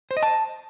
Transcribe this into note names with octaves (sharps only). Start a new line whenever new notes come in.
C5
D#5
A5